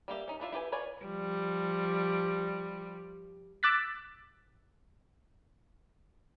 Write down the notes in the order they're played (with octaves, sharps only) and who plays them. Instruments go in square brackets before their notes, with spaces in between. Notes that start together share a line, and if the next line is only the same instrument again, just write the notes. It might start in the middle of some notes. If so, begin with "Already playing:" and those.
[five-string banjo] G3 A#3 G4 E5
C#4 D#4
D4 E4 F4 E5
E4 G4 B4 G#5
F4 B4 C#5 D5 G#5
[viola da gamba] F3 G3
[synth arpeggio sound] D6 E6 F#6 A6 B6